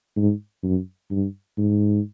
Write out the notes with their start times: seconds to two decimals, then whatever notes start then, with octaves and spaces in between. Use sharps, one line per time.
0.17 G#2
0.63 F#2
1.11 G2
1.58 G#2